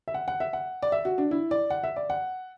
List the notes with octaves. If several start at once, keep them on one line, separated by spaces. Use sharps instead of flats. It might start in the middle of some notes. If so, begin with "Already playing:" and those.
E5
F#5
F#5
E5
F#5
D5
E5
F#4
D4
E4
D5
F#5
E5
D5
F#5